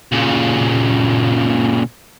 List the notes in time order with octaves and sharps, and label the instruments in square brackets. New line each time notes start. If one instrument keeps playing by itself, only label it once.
[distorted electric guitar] A#2 C#3